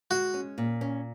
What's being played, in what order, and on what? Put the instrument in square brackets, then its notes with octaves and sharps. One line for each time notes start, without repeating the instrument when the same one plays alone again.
[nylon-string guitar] G#3 [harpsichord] F#4
[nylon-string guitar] C#4
A#2
C#4